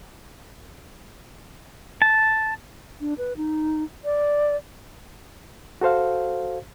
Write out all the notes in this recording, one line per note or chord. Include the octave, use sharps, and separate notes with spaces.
A5
D4
B4
D#4
D5
F#4 A4 C5 F5